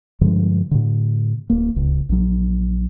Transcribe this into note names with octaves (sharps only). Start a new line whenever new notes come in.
G2 D3 F3 G#3
A2 D3
D1 A#3
D1 C#2
A#1 F#3